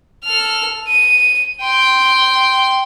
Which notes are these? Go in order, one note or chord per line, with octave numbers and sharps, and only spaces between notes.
A4 F6
D#7
G5 C6